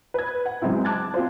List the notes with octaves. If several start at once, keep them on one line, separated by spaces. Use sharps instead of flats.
B4 G#6
F#5
C#3 F#3 G#3 C4 E4
A5 D6 F#6 G#6 A6
C4 F4 C5